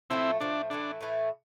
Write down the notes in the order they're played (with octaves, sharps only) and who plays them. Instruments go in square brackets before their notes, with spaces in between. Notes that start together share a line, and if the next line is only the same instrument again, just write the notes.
[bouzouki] A2 F3 A3 [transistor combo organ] C4 E4
[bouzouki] A2 F3 A3 [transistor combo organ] D4
[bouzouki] A2 E3 A3 E4 [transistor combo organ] D4
[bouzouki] A2 E3 A3 E4